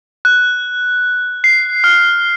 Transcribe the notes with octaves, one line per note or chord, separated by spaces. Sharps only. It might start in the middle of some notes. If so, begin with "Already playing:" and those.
F#6
C7
F6